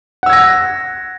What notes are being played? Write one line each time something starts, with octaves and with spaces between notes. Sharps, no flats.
F#5 E6 G#6 A#6